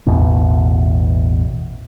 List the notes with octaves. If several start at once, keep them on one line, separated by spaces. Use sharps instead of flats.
A1 E2 B2